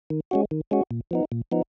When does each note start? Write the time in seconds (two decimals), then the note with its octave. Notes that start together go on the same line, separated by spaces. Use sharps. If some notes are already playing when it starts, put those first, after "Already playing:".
0.10 D#3
0.31 G#3 C#4 F#4
0.51 D#3
0.71 G#3 C#4 F#4
0.91 A#2
1.11 F3 B3 D#4
1.32 A#2
1.52 F3 B3 D#4